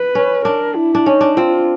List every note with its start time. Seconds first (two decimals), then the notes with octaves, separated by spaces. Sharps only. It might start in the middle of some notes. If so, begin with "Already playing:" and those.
Already playing: B4
0.15 C#4
0.45 D4 A#4
0.76 E4
0.95 D4
1.06 C#4 D#4
1.21 D4
1.36 C4 F4